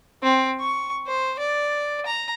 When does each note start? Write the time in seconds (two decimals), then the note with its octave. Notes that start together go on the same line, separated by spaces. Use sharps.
0.23 C4
0.61 C#6
1.07 C5
1.39 D5
2.06 A#5